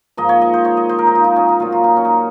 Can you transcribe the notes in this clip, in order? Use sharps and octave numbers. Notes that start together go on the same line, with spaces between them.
G#2 F3 A#3 D#5
C#5
D#5
C5
C#5
D#5
C5
A#4
D#4
F4
D#4
C#4
D#4
A#2 F#3 A#3 F4
F4
D#4
C#4
D#4